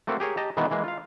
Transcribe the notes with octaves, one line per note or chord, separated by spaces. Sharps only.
A3 A#3 C4 F#4 A#4
G4 G#4 A#4 C#5
G4 D#5 A5 A#5
B2 D#3 E3 G#3 A#3 B3
E3 G#3 A#3
F4 F5